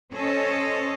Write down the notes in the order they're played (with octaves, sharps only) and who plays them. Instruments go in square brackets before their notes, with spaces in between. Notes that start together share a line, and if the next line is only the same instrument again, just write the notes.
[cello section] C#4 A4 C5 C#5 D#5